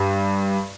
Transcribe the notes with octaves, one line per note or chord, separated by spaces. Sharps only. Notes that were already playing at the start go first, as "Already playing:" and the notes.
Already playing: G2